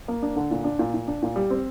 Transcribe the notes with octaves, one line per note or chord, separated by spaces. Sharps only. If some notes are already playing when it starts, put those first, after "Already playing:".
A#3
D4
D3
A#2
D4
A#2
A#2
D4
A#2
G3
C4